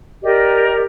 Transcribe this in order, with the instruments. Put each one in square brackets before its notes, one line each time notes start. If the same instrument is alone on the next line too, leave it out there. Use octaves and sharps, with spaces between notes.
[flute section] G4 A#4 D5 D#5